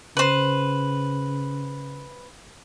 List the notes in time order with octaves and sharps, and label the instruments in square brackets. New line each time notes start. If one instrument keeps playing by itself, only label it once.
[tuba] C#3 [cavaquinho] B4 C5